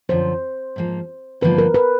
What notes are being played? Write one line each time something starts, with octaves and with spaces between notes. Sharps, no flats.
F#2 D3 F3 C5
G#2 F3 A#3
G2 D3 F3 A#3 D#4 B4
A#4
B4